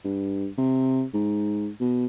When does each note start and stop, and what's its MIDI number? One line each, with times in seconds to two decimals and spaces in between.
0.04 0.47 43
0.58 1.03 48
1.14 1.69 44
1.80 2.06 47